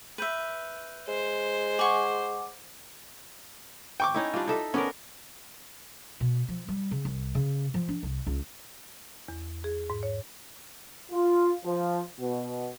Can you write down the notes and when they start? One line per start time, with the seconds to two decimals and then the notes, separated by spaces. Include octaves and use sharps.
0.18 B4 E5 G6 D#7
1.08 G#3 C5
1.79 G#4 F#5 C#6 D6
4.00 G5 C#6 D6
4.14 C#4 D#4 E4
4.34 G3 D4 F4
4.47 D#4 A4 E5
4.74 B3 C#4 D4 A#4
6.20 B2
6.48 F3
6.68 G3
6.91 C#3
7.05 C2
7.35 C#3
7.74 F3
7.88 D4
8.03 C2
8.27 C#2
9.28 E2
9.64 G#4
9.90 G#2
10.03 C#5
11.11 F4
11.65 F3
12.19 B2